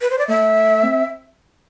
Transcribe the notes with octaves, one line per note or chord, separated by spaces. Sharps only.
B4
C5
D5
A3 E5
C4